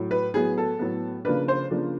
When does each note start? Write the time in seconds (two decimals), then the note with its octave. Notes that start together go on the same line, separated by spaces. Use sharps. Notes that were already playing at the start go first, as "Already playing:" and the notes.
Already playing: A2 F#3
0.11 B4
0.34 A2 F#3 B3 G#4
0.58 A4
0.79 A2 F#3 B3
1.25 C#3 F3 A#3 D4 B4
1.48 C5
1.70 C#3 F3 A#3 D4